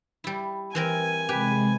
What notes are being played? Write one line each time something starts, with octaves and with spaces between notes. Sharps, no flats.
G3 E4
E3 C4 A#4 G#5
C3 G#3 G4 B4